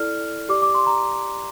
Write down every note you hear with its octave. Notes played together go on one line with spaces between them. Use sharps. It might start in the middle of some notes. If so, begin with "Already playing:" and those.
Already playing: E4 A4 D5 F6
G4 D5 D6
D6
C6
A#5